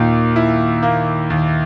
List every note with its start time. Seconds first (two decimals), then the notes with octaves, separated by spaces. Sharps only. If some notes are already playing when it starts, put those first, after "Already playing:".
Already playing: D#2 A#2 D#3
0.36 E4
0.83 A#3
1.30 D#2